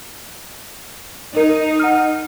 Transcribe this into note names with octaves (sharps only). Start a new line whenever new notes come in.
D#4 A#4
F#5 F6